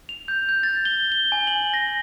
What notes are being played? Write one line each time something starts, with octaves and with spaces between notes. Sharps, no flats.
F7
G6
G6
A6
G7
G7
G#5
F#7
A#6